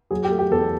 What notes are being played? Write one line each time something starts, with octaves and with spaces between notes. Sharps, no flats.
F#3 G#4
G4
A3
G4
E2 A4